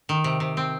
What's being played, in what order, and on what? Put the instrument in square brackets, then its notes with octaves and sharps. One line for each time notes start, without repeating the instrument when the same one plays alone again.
[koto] D#3
C3
C3
C4